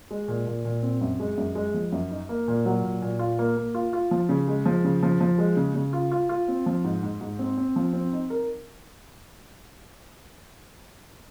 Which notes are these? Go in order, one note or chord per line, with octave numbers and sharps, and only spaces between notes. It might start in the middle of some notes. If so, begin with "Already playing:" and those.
G#3
A#2
A#2
A#2
C4
F#2
G#3
F#2
G#3
F3
F#2
D#4
A#3
A#2
F#3
A#2
A#2
F4
A#3
A#3
F4
F4
F3
C#3
G#3
F3
C#3
F3
F3
G#3
C#3
C#3
F4
F4
F4
C4
F3
G#2
G#2
G#2
C4
C4
F3
C4
D#4
A#4